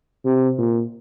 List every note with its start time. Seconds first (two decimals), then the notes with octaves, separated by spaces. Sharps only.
0.25 C3
0.58 A#2